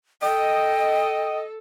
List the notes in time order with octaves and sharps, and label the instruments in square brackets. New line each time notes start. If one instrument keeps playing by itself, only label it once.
[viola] A4 [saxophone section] D#5 [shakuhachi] G5